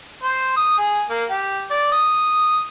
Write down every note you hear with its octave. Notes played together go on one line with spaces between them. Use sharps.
C5
D#6
G#4
A#3
G4
D5
D#6